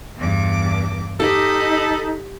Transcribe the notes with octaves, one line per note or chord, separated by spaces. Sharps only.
E2 G2 D6
D#4 G4 A4 D#5 B5